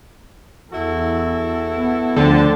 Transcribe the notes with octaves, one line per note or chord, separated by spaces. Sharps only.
E2 E4 F#4 A4
B3
D2 D3 F3 C5 G5 A5